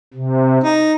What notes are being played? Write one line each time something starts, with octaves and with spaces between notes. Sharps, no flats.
C3
D#4